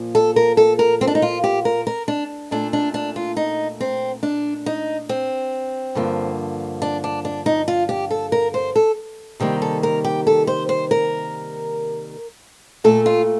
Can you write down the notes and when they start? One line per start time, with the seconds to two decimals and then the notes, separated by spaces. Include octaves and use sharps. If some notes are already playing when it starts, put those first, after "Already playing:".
Already playing: A#2 F3 A#3
0.15 A4
0.36 A#4
0.57 A4
0.79 A#4
1.01 C4
1.07 D4
1.15 D#4
1.22 F4
1.44 G4
1.65 A#4
1.87 A#4
2.08 D4
2.51 A#2 A3 D4
2.73 D4
2.94 D4
3.16 F4
3.37 D#4
3.81 C4
4.23 D4
4.66 D#4
5.09 C4
5.95 G2 D3 F3 A#3
6.82 D4
7.04 D4
7.25 D4
7.46 D#4
7.68 F4
7.89 G4
8.10 A4
8.32 A#4
8.54 C5
8.76 A4
9.40 C3 D#3 G3 A#3 G4
9.62 A4
9.83 A#4
10.04 G4
10.27 A4
10.47 C5
10.69 C5
10.91 A#4
12.84 A#2 A3 A4
13.06 F4